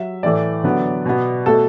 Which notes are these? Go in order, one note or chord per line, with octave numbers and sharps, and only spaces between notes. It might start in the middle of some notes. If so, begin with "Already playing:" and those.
Already playing: F#3 E5
A2 E3 A3 D5
D3 F#3 B3
B2 B3
B2 A3 A4